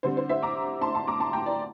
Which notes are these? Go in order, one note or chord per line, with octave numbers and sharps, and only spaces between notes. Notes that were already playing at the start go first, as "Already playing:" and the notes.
D3 G3 C4 C5
C5
C5 E5
A#5 D6
A5 C6
A5 C6
A#5 D6
A5 C6
G5 A#5
D5